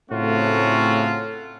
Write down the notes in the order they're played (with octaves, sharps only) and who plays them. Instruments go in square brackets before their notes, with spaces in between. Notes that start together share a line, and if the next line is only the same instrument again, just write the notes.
[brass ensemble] A2 C#3 A3 C4 F4 F#4